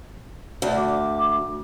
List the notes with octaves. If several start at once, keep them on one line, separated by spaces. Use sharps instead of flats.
D2 D5
D6